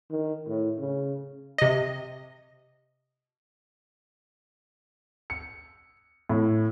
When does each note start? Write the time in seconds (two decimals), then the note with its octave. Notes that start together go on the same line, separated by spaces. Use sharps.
0.11 D#3
0.47 A2
0.79 C#3
1.58 C3 D#5
5.30 C#7
6.29 A2